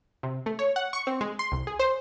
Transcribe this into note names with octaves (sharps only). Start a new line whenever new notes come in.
C3
A3
C#5
F#5
C#6
C4
G#3
C6
C2
G#4
C5